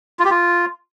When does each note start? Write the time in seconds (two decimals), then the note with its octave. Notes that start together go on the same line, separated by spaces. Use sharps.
0.19 F4
0.25 G4
0.30 F4